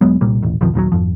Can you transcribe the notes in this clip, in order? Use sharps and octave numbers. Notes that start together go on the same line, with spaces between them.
E1 F#3 G#3 B3
C2 A#2 G3 A#3
D#1 A1
B1 F2 D#3 F3
A#1 D#2 F3 F#3
G#1 F2 F3